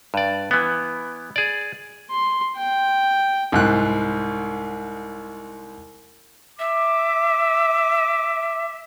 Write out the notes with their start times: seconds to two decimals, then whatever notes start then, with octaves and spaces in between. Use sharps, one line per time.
0.14 G2 D5
0.51 E3 B3
1.36 G#4 D5
2.10 C6
2.56 G5
3.52 C2 G#2 F#6
6.59 E5 D6